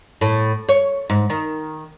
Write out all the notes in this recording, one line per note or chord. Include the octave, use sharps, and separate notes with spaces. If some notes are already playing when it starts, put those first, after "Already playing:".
A2
C#5
G#2
D#3